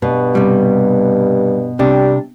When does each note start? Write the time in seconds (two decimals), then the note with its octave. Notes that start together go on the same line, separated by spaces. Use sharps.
0.02 G2 B2
0.35 C3 G3
1.79 C3 G3 D4